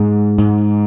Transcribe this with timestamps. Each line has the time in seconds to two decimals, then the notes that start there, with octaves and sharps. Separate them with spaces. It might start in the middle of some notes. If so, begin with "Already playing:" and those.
Already playing: G#2 G#3
0.38 G#2